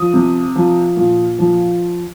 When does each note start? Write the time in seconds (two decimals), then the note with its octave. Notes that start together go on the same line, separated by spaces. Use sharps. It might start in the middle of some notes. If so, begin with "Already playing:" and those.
Already playing: F3 D#6
0.14 C3
0.56 F3
0.97 A#2
1.39 F3